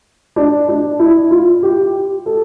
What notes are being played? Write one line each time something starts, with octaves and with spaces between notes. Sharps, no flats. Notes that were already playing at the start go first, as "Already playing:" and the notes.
D4
D4
E4
F4
G4
A4